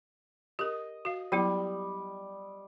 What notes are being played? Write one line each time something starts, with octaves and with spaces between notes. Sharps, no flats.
G4 A#4 D#5
F#4 F5
F#3 G3 B3 E4